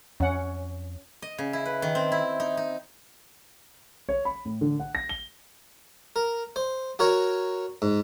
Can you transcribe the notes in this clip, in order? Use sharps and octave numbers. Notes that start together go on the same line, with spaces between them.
F2 C#4 F#5
D#5
C#3
E4
B4
D#3
C4
E4
D#4
D#4
C#5
B5
A2
D3
F#5
A#6
G7
A#4
C5
F#4 A#4 C#5
G#2